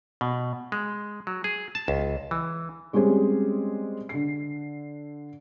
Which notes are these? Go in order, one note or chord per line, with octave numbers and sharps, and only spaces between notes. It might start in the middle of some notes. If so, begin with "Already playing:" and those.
B2
G#3
F#3
G#4
A5
C#2
E3
G3 G#3 C4 C#4 G#4 C5
D3 C7